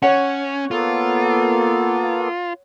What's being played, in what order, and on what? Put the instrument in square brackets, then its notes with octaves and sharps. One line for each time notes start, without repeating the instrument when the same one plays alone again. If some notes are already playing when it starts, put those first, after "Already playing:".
[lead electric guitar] C#4 [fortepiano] C#5 F#5
[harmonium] A#3 B3 A4 [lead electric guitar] F4